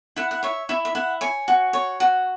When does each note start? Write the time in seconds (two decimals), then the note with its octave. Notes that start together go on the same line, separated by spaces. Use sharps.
0.16 E4 F#5
0.31 F#5
0.43 C#5 E5
0.69 E4 E5
0.85 E5
0.95 E4 F#5
1.21 C#5 G#5
1.48 F#4
1.73 C#5
2.00 F#4